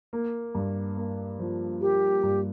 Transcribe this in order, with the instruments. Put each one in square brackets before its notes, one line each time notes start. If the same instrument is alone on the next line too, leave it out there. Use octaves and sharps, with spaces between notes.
[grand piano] A#3
G2
A#3
F3
[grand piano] A#3 [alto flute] G4
[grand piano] G2